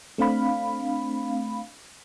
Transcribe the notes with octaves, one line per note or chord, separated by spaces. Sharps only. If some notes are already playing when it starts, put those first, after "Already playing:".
A3 C4 D4 F5 B5